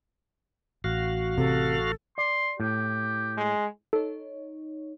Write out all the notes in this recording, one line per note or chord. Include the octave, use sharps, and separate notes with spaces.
A1 F#4 F5
C3 A4
D5 C6
A2 G4
G#3
D#4 A4 C#5